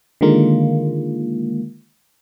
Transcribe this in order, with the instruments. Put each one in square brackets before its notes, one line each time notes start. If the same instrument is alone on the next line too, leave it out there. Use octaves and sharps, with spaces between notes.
[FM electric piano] D3 D#3 G#3 A#3 F4